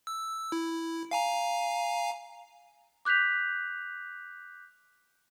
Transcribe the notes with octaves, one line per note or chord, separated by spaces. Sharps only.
E6
E4
F5 G#5 A#5
D6 F#6 G6 B6 F7